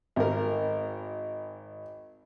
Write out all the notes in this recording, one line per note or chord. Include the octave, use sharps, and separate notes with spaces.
G#1 A#4